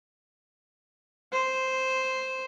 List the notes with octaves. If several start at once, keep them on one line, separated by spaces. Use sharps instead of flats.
C5